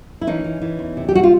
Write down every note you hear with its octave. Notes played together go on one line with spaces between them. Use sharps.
E4
E3 C#4 D#4
E3
E3
E2
C3
G4
G3 F#4
F4